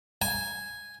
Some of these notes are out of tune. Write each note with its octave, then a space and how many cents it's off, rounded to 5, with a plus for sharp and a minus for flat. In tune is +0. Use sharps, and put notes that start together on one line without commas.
G#5 -5